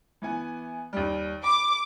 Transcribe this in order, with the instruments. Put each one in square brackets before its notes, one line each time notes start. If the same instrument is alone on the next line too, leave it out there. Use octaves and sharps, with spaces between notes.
[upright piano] E3 B3 G#5
D#2 G3
[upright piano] B5 [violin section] D6